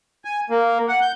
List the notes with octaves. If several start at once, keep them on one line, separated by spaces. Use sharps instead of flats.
G#5
A#3
F#5
G6